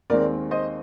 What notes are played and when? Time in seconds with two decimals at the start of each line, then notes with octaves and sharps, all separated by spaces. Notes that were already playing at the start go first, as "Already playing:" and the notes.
0.10 D#2 D#3 G#3 C4 A#4 D5
0.51 C5 D#5